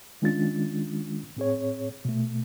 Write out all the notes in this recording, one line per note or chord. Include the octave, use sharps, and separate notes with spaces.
D#3 G#3 C#4 D4 F4 A6
A2 C4 G#4 C#5
B2 A3